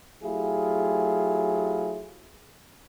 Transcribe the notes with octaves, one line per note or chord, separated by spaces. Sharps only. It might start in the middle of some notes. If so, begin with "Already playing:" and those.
F#3 A3 E4 F4 G4 G#4